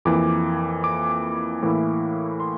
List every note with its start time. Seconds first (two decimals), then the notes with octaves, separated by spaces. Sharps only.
0.05 F2 E3 A#3 D6
0.84 D6
1.63 A2 E3 A#3 E4
2.40 C6